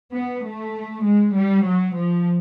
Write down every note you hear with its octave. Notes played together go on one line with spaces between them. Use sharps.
B3
A3
G#3
G3
F#3
F3